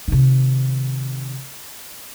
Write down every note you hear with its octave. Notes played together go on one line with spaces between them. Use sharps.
C3 D#3